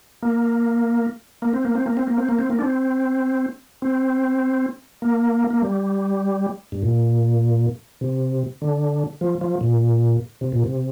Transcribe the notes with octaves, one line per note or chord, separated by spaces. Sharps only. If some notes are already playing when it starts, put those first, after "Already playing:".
A#3
A#3
C4
A#3
C4
A#3
C4
A#3
C4
A#3
C4
A#3
D4
C4
C4
A#3
A#3
G3
G2
A#2
C3
D3
F3
F3
A#2
C3
A#2
C3